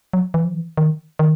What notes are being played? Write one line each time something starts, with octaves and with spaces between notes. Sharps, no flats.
F#3
E3
F3
E3
D#3
D#3